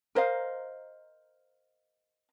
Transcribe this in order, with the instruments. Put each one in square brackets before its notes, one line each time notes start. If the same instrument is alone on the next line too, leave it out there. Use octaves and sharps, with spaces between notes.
[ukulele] A#4 C5 D#5 F5